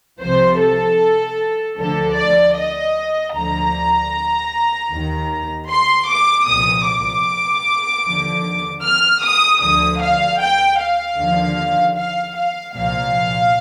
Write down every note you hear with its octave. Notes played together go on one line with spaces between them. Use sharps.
C2 C3 F3 C5
A4
D2 D3 F3 A4
D5
D#5
D2 D3 F3 A#5
D#2 D#3
C6
D6
C2 A#2 F3 D#6
D6
D#2 D3 F3
F6
D#6
D2 D3 F3 D#6
F5
G5
F5
D#2 D3 F3
F5
F5
C2 A#2 F3 F5